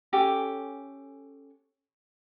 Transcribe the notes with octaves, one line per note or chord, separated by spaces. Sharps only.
C#4 G4 A4 G#5